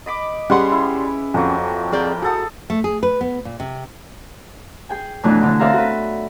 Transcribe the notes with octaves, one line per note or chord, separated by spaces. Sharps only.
D#5 B5 D6
G3 C#4 G#4 B4 F#5 C6
E4
F2 F#3 A#3
C4 G#4 A#4 D5 G5 B5
F#4 G#4 A4 F#5 D#6
A3
G#4
B4
B3
A#2
C3
G#4 G5 G#5
F2 B2 E3 F#3 A3 D4
D3 E3
C4 A4 D5 E5 F5 A#5
F#4 B4